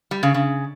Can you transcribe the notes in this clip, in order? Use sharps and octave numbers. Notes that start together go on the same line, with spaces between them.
G3
C#3
C#3